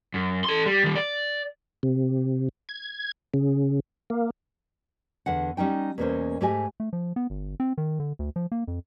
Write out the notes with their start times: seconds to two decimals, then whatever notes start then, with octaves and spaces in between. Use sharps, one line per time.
0.14 F#2
0.44 A4 C6
0.66 G3
0.84 D#3 G3
0.95 D5
1.83 C3
2.69 G#6
3.34 C#3
4.10 A#3
5.26 E2 D3 F#5
5.57 G3 C#4 D#4 G5
5.98 E2 B2 A#3 B3 C#4 C5
6.41 G#2 A3 G4 G#4 D#5 G#5
6.80 A3
6.93 F3
7.16 B3
7.30 G1
7.60 C4
7.78 D#3
8.00 D3
8.19 D2
8.36 F3
8.52 A#3
8.68 F2